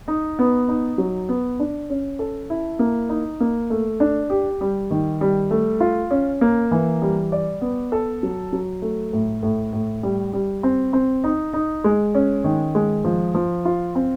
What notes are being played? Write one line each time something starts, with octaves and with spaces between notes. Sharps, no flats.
D#4
B3
D#4
F#3
B3
D4
C#4
A4
E4
A#3
D#4
A#3
A3
D4
G4
G3
D#3
G3
A3
F4
C#4
A#3
E3
G3
D5
B3
A4
F#3
F#3
A3
A2
A2
A2
G3
G3
C4
C4
D#4
D#4
G#3
C#4
D#3
G#3
F3
F3
F4
C4